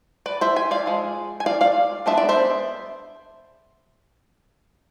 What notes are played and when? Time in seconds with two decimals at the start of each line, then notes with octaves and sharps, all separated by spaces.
0.26 B4 D5
0.41 C5 E5
0.56 E5 G#5
0.71 D5 F5
0.86 F3 G#3
1.40 G#5
1.46 D5 F5
1.61 D5 F5
2.06 G#3 B3 D4 E5
2.17 D5
2.29 C5 E5